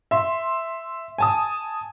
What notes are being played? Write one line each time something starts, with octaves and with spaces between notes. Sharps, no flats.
E5 C6
G#5 A5 D#6